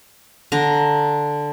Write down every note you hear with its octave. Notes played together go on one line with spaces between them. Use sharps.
D3 D4 A#5